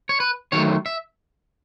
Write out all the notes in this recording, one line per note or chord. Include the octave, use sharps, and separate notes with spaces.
C#5
B4
D#3 F#3 A3 C#5
E5